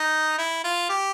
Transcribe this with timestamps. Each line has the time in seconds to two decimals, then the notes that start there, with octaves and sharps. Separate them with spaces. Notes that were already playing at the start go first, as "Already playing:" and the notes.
Already playing: D#4
0.38 E4
0.64 F4
0.89 G4